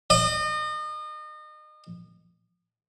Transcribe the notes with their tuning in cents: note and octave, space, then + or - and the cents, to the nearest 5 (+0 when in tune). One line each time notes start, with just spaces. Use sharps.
D#5 -35